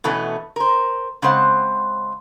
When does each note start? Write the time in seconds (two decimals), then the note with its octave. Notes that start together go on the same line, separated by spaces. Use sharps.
0.04 B2 E3 A3 B3 C#4
0.56 A#4 C5
1.22 C#3 G#3 C4 C5 F#5